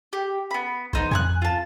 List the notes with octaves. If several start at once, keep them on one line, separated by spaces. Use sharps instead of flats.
G4
B3 B5
A1 B3 D#4 C5
F2 G#5 A#5 F#6
F4 A5